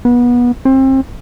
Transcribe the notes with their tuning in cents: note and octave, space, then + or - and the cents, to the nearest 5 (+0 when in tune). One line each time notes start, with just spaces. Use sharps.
B3 -25
C4 +30